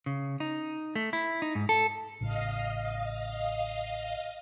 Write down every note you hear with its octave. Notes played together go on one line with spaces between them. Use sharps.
C#3
D#4
A3
E4
D#4
G#2
A4
A1 A2 C#3 D#5 F5